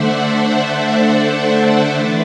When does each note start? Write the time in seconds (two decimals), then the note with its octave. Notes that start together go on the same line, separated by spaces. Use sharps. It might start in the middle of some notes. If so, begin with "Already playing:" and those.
Already playing: D3 A3 D4 C5 D5 E5 F#5
0.47 C5 E5
1.90 E3 A3 D4 B4 D5